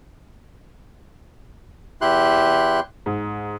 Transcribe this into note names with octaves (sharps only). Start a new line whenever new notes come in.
E2 E4 G4 C6 F#6
G#2